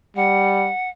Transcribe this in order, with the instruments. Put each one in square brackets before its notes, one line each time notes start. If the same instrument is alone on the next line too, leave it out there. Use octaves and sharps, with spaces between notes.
[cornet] G3 [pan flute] F#5